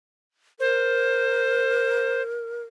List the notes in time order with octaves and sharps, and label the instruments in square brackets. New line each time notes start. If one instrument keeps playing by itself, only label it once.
[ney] A#4 [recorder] C5